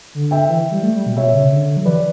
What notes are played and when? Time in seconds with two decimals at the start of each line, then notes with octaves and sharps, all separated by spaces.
0.15 D3
0.31 E5 G5
0.49 E3
0.71 G3
0.83 A3
0.95 G3
1.06 B2
1.17 B2 C#5 E5
1.34 C#3
1.52 D3
1.77 F#3
1.85 E3 B4 D5